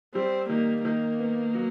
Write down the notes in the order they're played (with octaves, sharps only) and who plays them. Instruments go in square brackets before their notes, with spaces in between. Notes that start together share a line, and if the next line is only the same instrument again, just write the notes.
[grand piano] G3 [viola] C4
[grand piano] D#3 [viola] A#3
[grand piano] D#3 [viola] A#3
[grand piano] B3
F#3